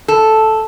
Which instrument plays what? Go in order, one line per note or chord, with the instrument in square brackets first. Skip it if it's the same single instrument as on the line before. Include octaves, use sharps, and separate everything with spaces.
[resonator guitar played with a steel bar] A4